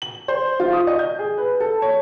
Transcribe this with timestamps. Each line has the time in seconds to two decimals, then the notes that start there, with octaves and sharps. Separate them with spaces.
0.02 F#7
0.28 C5
0.60 F4
0.73 D#6
0.87 D#5
0.99 G6
1.19 G#4
1.38 B4
1.60 A4
1.82 C#5